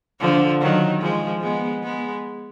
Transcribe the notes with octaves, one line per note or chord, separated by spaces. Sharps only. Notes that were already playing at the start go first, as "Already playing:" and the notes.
D3 F3
D#3 F#3
F3 G#3
G#3 B3
G#3 B3